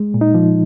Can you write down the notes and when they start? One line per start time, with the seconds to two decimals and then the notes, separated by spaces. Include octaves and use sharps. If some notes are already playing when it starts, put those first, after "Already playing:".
Already playing: G#3
0.14 A#2
0.21 D#4
0.34 F3